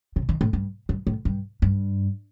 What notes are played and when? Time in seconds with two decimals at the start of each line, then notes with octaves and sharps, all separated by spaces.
0.16 C3
0.29 D#3
0.41 A2
0.53 G2
0.89 G2
1.07 A2
1.25 G2
1.62 G2